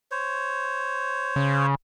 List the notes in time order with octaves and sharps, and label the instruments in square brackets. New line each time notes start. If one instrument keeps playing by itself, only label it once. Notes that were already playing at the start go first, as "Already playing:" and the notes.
[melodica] C5 C#5
[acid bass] C#3